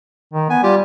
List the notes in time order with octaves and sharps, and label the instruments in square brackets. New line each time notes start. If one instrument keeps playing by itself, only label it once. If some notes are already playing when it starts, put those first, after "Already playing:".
[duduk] D#3
[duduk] B3 [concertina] G#5
[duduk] G3 [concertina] F4 G4